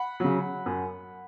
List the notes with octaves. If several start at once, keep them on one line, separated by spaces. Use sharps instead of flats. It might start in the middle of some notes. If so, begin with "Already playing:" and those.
Already playing: F#5 B5
C#3 F#3
F#2